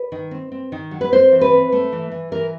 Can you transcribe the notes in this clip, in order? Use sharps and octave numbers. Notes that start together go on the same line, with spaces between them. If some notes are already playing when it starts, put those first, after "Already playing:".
Already playing: B4
D#3
C4
C4
D#3
F#3
B4
C4 C5
E3
B4
C4
A3
E3
E3
E3 A#4